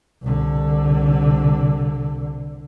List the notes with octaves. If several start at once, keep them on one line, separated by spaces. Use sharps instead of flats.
C2 D3